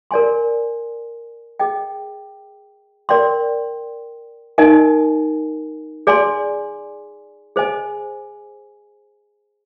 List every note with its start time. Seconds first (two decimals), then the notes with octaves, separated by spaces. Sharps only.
0.11 A#4 D5 G#5 C6
1.60 G#4 D#5 G5
3.09 A#4 D5 G5 C6
4.58 D#4 A#4 D#5 G#5
6.07 G#4 D5 G#5 C6
7.56 G#4 C5 D#5 G#5